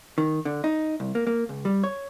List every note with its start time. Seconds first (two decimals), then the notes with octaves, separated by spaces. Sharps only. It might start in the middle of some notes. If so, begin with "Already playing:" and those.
0.18 D#3
0.45 D3
0.64 D#4
1.00 C2
1.15 A#3
1.27 A#3
1.49 C#2
1.65 G3
1.84 C#5